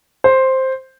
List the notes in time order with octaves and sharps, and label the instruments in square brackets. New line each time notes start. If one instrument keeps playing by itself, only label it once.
[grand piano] C5